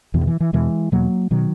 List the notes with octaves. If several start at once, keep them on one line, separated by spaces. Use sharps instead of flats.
E2 B2 E3
D#3
E3
E3
E2 B2 E3 G#3
E2 B2 F#3 A#3
B2 D#3 F#3